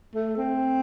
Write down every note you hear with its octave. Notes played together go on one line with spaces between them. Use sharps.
A3
C4